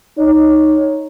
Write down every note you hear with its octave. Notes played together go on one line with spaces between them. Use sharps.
D#4 C#5